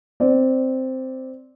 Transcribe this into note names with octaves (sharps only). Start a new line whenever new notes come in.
C4 D5